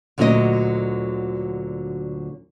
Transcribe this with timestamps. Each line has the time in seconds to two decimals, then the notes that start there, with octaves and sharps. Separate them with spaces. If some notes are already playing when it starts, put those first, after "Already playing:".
0.18 D2 A#2 D3 F#3 E4 D#5